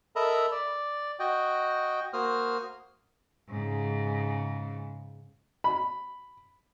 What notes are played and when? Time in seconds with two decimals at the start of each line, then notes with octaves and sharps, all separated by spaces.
0.16 A4 A#4 D#5 E5 A#5 B5
0.52 D5
1.20 F#4 D#5 G5
2.13 A#3 F#4 C5 D#6 F6
3.49 G#2 C#3
5.64 B5